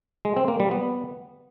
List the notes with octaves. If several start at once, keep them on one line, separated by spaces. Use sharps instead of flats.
G#3
C4
A#3
G3
B3